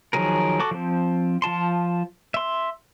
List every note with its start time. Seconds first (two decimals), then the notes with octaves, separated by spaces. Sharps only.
0.13 D#3 F3 F#3 G#4 A#4
0.60 F#4 A4 D6
0.71 F3 C4
1.42 F3 F4 A5 C6
2.34 E5 C6